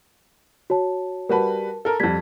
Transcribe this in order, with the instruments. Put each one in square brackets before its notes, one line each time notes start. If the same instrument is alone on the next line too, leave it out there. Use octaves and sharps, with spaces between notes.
[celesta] F#4 C#5 A5
[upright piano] G3 F#4 B4 [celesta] A#4 A5
[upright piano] A4 A#4
[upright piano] F2 G3 [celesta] G#6 B6